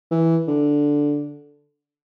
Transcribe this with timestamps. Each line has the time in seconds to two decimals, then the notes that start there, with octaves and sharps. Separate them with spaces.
0.11 E3
0.48 D3